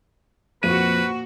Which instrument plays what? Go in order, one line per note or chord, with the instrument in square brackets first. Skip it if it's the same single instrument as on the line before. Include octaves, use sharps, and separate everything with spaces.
[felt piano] F2 D#7 [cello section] A#2 F#4 [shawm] B4